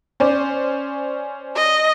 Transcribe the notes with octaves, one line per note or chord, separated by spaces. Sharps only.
C#4 C5 D5
D#5